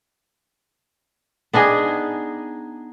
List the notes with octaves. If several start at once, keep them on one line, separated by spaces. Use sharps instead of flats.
B3 D4 D#4 G#4